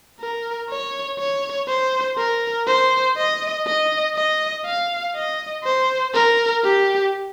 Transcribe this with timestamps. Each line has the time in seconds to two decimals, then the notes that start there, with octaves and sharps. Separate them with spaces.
0.20 A#4
0.69 C#5
1.19 C#5
1.68 C5
2.18 A#4
2.67 C5
3.17 D#5
3.66 D#5
4.15 D#5
4.66 F5
5.15 D#5
5.64 C5
6.15 A#4
6.64 G4